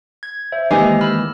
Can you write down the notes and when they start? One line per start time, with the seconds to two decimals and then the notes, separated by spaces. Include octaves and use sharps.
0.23 G#6
0.52 C5 E5
0.71 D#3 E3 G#3 A#3 D#4 G4 D#5
1.01 B5 E6 F6